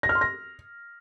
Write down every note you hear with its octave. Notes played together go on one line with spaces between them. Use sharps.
A#6
F6
C6
A#6